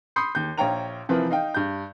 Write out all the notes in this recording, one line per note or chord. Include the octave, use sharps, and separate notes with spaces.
B5 C6 D#6 G6 C7 C#7
D#2 G6
A#1 C#5 F5 G5 A#5 F7
C3 E3 F3 C4 A#4 B4
D#4 F5 G5
G2 G6